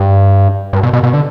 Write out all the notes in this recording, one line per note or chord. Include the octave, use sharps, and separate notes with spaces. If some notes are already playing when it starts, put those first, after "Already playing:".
Already playing: G2
G2
B2
B2
B2
D3